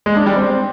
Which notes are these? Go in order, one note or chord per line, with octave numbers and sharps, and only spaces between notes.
G#3
D4
G3
C4